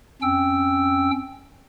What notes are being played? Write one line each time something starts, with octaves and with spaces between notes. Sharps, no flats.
F2 C#4 G5 E6